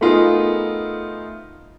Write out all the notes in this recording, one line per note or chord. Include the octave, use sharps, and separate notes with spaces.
A3 B3 D#4 F4 G#4 A#4